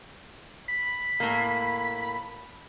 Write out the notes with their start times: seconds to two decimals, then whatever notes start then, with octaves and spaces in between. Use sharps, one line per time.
0.68 B5
1.20 A2 A#3